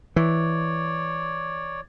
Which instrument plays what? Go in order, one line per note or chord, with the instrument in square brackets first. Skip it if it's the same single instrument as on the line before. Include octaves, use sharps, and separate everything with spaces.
[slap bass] E3 [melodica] C#5 D5